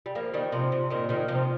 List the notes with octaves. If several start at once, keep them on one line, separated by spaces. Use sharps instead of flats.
G3
F3 A#3
D#3 G3
C3 F3
C3
A#2 D#3
A#2 D#3
C3 F3